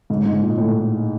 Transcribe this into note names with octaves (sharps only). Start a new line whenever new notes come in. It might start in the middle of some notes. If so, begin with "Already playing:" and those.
G#2
G#2
A#2
A2